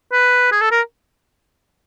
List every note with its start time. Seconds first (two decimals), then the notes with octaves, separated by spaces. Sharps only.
0.13 B4
0.52 G#4
0.61 A4
0.71 A#4